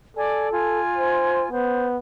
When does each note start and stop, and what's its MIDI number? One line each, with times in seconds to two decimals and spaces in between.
0.16 0.80 69
0.16 0.49 74
0.16 0.49 80
0.51 1.49 65
0.51 1.49 80
0.97 1.44 72
1.51 1.98 59
1.51 1.85 72